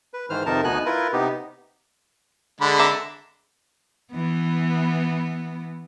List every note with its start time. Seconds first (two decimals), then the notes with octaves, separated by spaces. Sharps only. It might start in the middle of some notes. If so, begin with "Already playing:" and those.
0.14 B4
0.30 G#2 D#3 E3 C5 F6
0.46 F2 C3 D#3 D#4 A#4 A5
0.64 D2 B2 B3 D#4 G#5 F#6
0.86 E4 F4 A#4 B4
1.13 C3 B3 D#4 G4
2.61 D3 G#3 B5
2.79 E5 A#5 D6
4.12 E3 B3